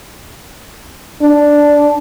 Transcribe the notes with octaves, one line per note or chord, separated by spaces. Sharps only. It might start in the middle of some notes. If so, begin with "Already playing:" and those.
D4